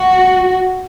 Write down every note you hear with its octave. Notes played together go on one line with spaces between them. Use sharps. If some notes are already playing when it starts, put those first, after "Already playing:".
Already playing: F#4